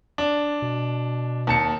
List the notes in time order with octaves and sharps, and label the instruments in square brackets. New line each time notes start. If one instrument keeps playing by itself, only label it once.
[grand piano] D4
[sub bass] B2
[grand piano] D#2 A5 C#7